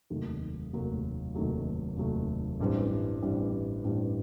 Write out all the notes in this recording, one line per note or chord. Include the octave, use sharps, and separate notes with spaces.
F1 D#2 D#3 F#3 A3
F1 D#2 D#3 F#3 A3
F1 D#2 D#3 F#3 A3
F1 D#2 D#3 F#3 A3
A1 G2 E3 G3 C4
A1 G2 E3 G3 C4
A1 G2 E3 G3 C4